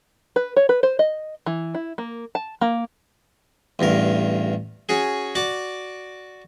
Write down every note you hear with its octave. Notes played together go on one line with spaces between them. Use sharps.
B4
C#5
B4
C5
D#5
E3
E4
A#3
A5
A#3
A1 E2 G2 A#4
C#4 F#4 G#4
F#4 D5 D6